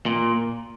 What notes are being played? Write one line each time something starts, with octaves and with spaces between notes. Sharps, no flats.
A#2